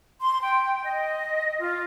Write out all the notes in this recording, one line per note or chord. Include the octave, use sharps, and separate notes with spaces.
C6
G5
D#5
F4